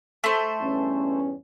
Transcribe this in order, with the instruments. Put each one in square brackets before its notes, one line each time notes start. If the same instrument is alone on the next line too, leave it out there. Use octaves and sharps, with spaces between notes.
[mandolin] A3 C5
[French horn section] E2 G2 C#4